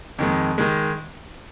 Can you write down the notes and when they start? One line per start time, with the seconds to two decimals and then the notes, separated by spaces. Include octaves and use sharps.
0.19 F2 D#3 G#3
0.58 D#3 G#3